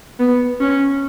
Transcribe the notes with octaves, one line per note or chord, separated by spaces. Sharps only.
B3
C#4